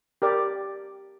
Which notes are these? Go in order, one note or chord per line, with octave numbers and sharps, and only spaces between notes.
G4 A#4 D5